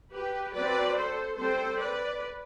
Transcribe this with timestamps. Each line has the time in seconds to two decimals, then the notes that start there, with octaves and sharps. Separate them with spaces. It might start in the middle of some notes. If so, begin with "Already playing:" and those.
0.13 G4 B4
0.54 F#3 C4 B4 D5
0.95 A4 C5
1.37 G3 C4 A4 C5
1.79 B4 D5